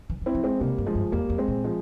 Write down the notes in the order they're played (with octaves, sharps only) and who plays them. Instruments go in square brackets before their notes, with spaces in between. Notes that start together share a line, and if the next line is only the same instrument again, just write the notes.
[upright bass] E3
E3
[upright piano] C4 E4
[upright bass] F3
[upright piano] G#3 C4
[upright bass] C3 [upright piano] G3 A#3
[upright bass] G2
[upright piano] F3 G#3
[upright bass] G2
[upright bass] E2 [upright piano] G3 A#3
[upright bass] F2
[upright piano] G#3 C4
[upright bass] A#2
[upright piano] F3 G#3